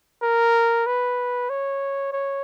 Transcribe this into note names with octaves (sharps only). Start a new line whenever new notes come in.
A#4
B4
C#5
C#5